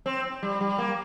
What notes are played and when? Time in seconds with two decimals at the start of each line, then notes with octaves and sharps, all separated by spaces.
0.06 C4
0.43 G3
0.61 G3
0.78 A#3